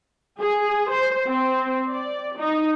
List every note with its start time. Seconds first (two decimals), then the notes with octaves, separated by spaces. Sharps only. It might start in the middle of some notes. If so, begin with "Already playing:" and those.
0.39 G#4
0.91 C5
1.27 C4
1.89 D5
2.38 D#4